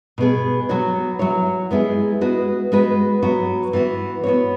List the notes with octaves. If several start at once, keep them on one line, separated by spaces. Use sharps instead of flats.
B2 B3 G#4
F#3 B3 F#4 C#5
F#3 E4 C#5
G#3 B3 E4 G#4
G#3 B3 F#4 B4
G#3 B3 F#4 B4
F#3 B3 F#4
E3 B3 F#4
B3 F#4 C#5